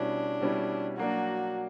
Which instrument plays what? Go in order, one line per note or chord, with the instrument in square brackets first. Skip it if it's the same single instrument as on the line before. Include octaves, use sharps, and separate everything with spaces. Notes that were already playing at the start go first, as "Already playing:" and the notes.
Already playing: [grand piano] B2 G3 C#4 E4 [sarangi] D4
[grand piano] B2 G3 C#4 E4
[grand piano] F#3 A#3 D4 [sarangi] F#4